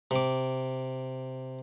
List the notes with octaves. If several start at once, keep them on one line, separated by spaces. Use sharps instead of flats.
C3 D6